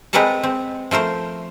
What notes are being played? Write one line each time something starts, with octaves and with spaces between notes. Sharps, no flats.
G#3 C4 A#4 B4 F#5 A5
C4
F3 A3 A#4 C5